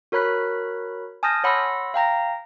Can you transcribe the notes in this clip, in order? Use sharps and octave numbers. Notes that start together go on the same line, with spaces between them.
F#4 A#4 C#5 B5 F#6 B6
G#5 A5 D#6 F6 G6 A#6
C#5 F#5 B5 C6 E6 A#6
F5 G5 A#5 A#6